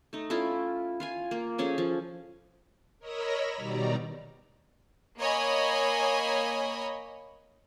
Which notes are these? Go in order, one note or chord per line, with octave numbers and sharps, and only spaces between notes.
A3 D#4
C#4 E4 F4 A4
F4 F5 G#5
A#3
F3 C#4 G#4 A4
F3
A#4 C#5 D#5 B5 E6 A#6
B2 D#3 G3 D5 A#5
A#3 C#5 D#5 G#5 B5